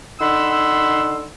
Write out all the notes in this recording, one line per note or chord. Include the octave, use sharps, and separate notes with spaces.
D3 D#4 F#5 B5 C6 E6